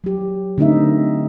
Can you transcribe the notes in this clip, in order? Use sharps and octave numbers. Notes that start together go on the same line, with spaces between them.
F#3 G4
D3 A3 C4 D#4 A#4 E5